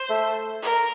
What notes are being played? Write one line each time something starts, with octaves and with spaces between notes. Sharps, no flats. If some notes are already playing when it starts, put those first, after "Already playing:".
Already playing: C5
A3
A#4